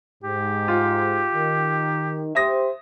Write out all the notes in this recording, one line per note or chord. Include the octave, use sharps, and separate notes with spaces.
G#2 G4
F4
D#3
G4 C5 E5 D#6 A#6